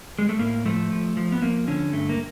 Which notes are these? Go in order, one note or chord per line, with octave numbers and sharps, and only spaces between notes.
G#3
A3
A2 A#3
F3 A3
F3
F3
B3
F3 A#3
D3 C#4
G2 A3
A#3